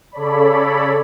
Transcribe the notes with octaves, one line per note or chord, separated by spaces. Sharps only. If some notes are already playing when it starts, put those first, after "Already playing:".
C#3 A4 C#5 D5 B5